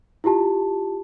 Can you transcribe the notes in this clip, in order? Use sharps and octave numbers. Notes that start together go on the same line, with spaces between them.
E4 F4 G4 A5